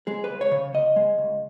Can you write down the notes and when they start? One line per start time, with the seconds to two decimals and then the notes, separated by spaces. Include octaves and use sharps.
0.07 G#3 G#4
0.24 B4
0.30 C#2
0.41 C#5
0.51 C#3
0.74 C#2 D#5
0.96 G#3
1.18 C#2